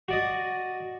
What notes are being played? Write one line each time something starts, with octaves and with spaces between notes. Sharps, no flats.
F#4 D5 D#5